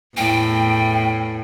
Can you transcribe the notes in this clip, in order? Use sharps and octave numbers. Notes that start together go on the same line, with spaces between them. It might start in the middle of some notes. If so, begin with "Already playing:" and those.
E2 A2 G5